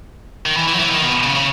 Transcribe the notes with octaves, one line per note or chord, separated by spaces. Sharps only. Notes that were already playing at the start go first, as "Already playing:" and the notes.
D#3
E3
E3
F#3
E3
D#3
B2
C#3
C#3